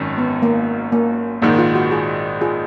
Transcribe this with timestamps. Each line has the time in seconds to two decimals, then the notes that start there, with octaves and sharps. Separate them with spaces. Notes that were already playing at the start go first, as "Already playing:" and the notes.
Already playing: G#1 F#2 D#3
0.18 B3
0.42 A#3
0.92 A#3
1.42 A#1 G#2 D#3 A#3
1.59 F4
1.75 F#4
1.91 F4 G#4
2.41 F4 G#4